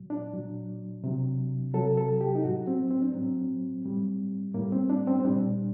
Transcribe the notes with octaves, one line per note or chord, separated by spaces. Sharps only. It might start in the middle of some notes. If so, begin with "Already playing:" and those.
Already playing: A#2 F#3
D4
A#2 F#3
C3 F#3
C3 F#3 A4
A4
G4
D#4
A2 F#3 F#4
C4
C4
D4
A2 F#3 C4
A2 G3
A2 G3 A#3
C4
D4
C4
C4
A#2 G3 D4